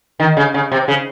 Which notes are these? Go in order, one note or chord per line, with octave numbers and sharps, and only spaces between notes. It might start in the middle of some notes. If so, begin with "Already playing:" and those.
D#3
C#3
C#3
C3
C#3